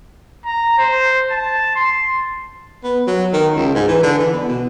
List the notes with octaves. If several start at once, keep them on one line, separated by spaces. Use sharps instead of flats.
A#5
C5
A5
C6
B3
F#3
D#3
C#2
G#2
E3
D3
E3
B3
B2